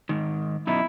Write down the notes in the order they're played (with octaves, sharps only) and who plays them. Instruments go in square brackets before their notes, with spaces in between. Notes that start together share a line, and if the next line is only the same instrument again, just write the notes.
[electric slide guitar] G#2 D#3
[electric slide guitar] F#2 B2 D#4 [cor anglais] E4